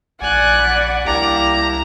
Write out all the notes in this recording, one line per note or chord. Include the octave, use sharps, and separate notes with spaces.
A#1 D5 F#5 G#5 F#6
B5
C2 A#3 D4 E4 G4 A#5